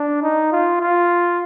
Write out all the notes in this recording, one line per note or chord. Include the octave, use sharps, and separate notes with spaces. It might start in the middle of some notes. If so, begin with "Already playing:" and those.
Already playing: D4
D#4
F4
F4